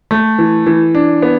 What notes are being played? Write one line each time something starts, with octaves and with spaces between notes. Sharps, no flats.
A3
E3
E3
D4
B3